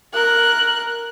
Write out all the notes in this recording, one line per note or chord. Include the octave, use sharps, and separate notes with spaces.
A#4 F#6